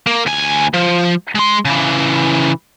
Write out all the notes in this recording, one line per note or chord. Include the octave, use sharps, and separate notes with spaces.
A#3
D2 G#5
F3
G#3 C6
C#3 E3